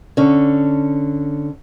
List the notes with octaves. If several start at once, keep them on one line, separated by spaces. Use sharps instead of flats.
D3 C#4